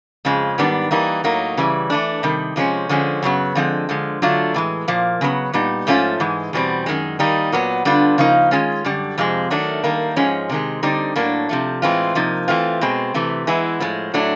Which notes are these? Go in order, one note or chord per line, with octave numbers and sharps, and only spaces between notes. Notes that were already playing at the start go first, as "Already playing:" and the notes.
F2 C#3 F3 G#3
G#2 D#3 G3 B3 D4
E3 G3 A#3 D#4
A2 F#3 A#3 D#4
C#3 E3 G3
E3 A3 D4
C3 D#3 G3
C3 F3 G#3 C#4
D3 F3 G#3 C#4
F#2 C#3 F#3 B3
D3 F3 G#3 C4
D3 F3 G#3
D3 F#3 A3 D4 F4
A2 E3 G#3
A#2 F3 A#3
C#3 F#3 B3
A#2 G3 B3 D#4
G#2 F3 A3 C#4 F4
G#2 E3 G#3
E2 B2 G3 C4
F#2 D#3 G#3
D#3 G3 A#3 D#4
A#2 F#3 B3
D3 G3 B3 D4 F4
C#3 F3 A#3 D#4
D#3 G#3 C#4 F4
F#2 D3 G3
F2 C3 F3 G#3
D#3 F#3 A3 D4
D#3 G3 A#3
G#2 F3 G#3 C#4
C3 D#3 G#3
D3 G3 C4 D#4
A2 F#3 A#3 D4
C3 F3 A3
A2 E3 G#3 C4 F4
C3 F3 A#3 D#4
E3 A3 C4 F4
B2 G#3 C4
C3 E3 A3
E3 G#3 B3 E4
A2 F3 G#3
A2 F#3 A3 D4